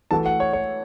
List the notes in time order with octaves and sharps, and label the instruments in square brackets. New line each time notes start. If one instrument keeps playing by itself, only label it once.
[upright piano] E3 A3 F#4 A4 [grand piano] A5
[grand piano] F#5
C#5
C#5